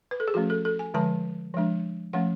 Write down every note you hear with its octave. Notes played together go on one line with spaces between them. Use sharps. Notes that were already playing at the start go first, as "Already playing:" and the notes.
B4
A4
G#4
F3 A3 C#4 F#4
A4
A4
G#5
D3 F3 G#3 A5
F3 G#3 D4
F3 A3 C#4 F#5